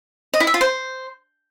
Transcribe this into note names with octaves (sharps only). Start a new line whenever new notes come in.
D#5
E4
E5
F4
C5